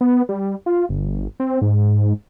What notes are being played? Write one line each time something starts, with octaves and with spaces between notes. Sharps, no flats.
B3
G3
F4
G1
C4
G#2